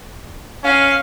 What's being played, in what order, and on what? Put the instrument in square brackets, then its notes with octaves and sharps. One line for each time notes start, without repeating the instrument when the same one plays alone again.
[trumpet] C#4 [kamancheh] F5